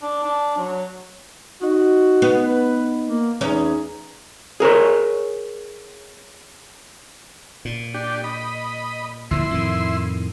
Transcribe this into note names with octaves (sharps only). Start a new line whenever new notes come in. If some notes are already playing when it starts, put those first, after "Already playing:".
D4
D4
F#3
D#4 F#4 D#5
B3
B4
A#3
E2 C#4 D#4 G#4 A#5
G#4 A#4 C5 C#5
A#2
D4 G4
D#5 B5
D2 A#2 F3 E4 C6
F2 A2 D#3